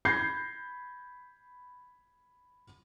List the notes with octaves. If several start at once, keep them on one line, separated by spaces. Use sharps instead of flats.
B5 G6 G#6 A#6 C7